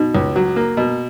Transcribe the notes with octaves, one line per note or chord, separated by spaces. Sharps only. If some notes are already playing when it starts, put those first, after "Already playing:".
Already playing: B2 D#4
C#2
F#3
A#3
B2